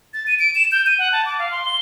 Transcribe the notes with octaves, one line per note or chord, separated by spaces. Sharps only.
A6
D#7
D7
E7
G6
D#7
F#5
A5
D6
F5
C6
G7